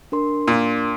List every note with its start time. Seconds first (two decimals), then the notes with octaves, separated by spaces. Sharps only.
0.12 D4 A#4 C6
0.48 A#2